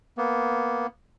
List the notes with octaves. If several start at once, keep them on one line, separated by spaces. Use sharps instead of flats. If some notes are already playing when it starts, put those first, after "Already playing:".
A#3 B3